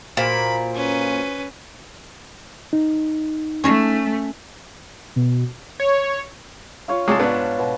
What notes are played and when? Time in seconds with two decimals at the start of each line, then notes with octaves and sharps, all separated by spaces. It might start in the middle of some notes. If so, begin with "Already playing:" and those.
0.17 A#2 F#4 C5 B5 D7
0.75 C#4 B4
2.73 D#4
3.64 A3 C#4 C#5 A5
5.16 B2
5.80 C#5
6.88 F4 C#5 F5
7.08 C3 G#3 C#5 A5 D6
7.19 G#2 B3 D4
7.59 B2